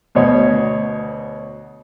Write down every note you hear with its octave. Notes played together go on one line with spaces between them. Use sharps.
D2 B2 C#5